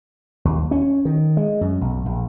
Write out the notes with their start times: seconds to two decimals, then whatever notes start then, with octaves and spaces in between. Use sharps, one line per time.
0.45 D#2
0.71 C#4
1.05 D#3
1.37 G#3
1.61 F#2
1.81 B1
2.06 A#1